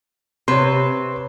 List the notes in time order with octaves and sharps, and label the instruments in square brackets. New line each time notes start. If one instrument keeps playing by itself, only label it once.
[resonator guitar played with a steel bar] C3 B4 [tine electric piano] C#5 C6